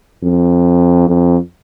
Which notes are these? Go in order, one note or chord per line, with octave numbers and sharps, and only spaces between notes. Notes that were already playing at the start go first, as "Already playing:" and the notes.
F2
F2